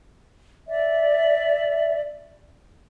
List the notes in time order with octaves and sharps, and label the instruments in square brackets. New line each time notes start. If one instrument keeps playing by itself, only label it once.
[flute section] D5 E5